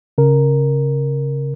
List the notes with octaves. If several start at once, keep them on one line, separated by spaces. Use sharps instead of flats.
C#3 A#4